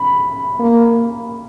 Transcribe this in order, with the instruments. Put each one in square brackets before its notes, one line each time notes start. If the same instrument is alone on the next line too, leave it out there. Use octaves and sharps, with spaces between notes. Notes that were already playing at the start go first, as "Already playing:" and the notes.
Already playing: [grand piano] B5
[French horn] A#3